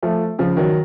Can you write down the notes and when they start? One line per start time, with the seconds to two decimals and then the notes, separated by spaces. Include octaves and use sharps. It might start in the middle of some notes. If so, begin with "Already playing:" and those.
0.03 F3 A3
0.39 C#3 F3
0.57 D#3 F#3